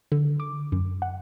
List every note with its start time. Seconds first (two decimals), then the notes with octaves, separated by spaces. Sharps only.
0.12 D3
0.40 D6
0.72 F#2
1.02 F#5